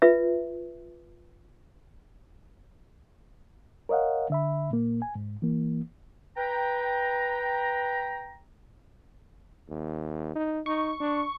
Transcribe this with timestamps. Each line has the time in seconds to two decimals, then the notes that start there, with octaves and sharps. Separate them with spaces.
0.02 F4 B4 E5
3.89 A#4 C#5 D#5 F5 F#5
4.30 D3 E5 B5
4.71 A#2 A#3
5.02 G#5
5.15 G#2
5.42 E3 A#3
6.37 B4 G5 A#5
9.69 D#2
10.35 D#4
10.66 D#4 C#6
11.00 D4